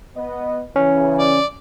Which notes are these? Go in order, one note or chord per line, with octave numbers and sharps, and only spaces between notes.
B3 D#5
C#3 E3 C#4
D5